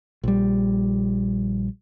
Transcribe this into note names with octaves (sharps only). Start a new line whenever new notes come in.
A#1 G3